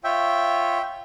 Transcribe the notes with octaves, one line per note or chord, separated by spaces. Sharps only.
F4 C#5 E5 G5